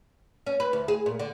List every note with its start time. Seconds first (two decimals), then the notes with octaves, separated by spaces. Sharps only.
0.46 C#4
0.60 B4
0.73 D2
0.88 G#4
1.06 A#2
1.19 D3